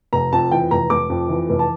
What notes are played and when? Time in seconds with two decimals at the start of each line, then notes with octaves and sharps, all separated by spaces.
0.13 F1 A#5
0.32 F2 A5
0.51 E3 G5
0.71 F1 A#5
0.90 F1 D6
1.10 F2
1.29 E3
1.49 F1
1.59 A5